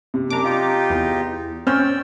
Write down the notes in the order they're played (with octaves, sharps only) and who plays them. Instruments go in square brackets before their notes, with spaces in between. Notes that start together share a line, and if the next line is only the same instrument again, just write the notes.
[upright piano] C3
[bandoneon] F#2 D4 [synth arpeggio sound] A#5 D6
[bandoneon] D#4 F4 G4
[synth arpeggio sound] E2
[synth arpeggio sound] C4 C#4 [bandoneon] D5 E6 [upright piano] F6 G6